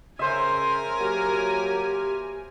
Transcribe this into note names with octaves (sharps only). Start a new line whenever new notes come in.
C#3 A#4 C5 E5 G#5
F#3 A#3 G4